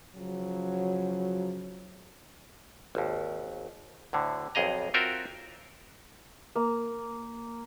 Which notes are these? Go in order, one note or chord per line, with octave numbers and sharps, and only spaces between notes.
C#3 F3 F#3
G#1 D#2
D2 A2 D3
B1 F2 G#4 D#5 A#5
C4 F4 F#4 A#4 E5 G5
A#3